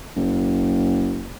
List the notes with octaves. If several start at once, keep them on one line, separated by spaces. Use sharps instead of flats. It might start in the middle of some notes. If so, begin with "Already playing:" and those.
F#1